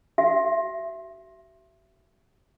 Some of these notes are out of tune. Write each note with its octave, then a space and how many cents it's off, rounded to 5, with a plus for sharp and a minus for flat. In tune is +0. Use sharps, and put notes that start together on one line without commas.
F#4 +35 E5 +20